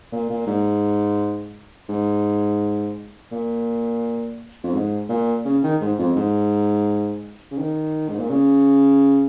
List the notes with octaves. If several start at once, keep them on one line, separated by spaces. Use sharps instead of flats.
A#2
A#2
G#2
G#2
A#2
F2
G#2
A#2
C#3
D#3
G#2
F2
G#2
C#3
D#3
G#2
A#2
C#3